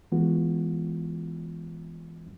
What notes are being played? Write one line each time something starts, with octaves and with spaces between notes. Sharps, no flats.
E3 G#3 B3 F4 F#4